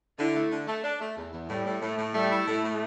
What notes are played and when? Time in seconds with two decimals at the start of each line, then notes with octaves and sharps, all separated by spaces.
0.19 D3 E4
0.35 A3
0.51 D3
0.68 A3
0.84 D4
1.01 A3
1.17 E2
1.33 E2
1.49 A2 G3
1.65 A2
1.82 A2 A3
1.98 A2
2.15 G3 A3
2.31 E4
2.47 A2 A3
2.64 A2